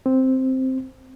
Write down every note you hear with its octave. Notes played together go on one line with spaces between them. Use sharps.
C4